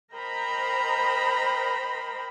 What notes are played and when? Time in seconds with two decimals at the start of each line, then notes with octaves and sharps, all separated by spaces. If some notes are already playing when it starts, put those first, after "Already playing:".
0.14 A#4 C5 D#5 G5 A#5 B5